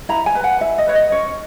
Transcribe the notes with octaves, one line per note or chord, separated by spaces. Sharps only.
E4 A#5
G#5
B4
F#5
E4 E5
D#5
B4 C#5
D#5
C#4 C#5